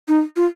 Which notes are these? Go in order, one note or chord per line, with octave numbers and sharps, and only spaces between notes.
D#4
F4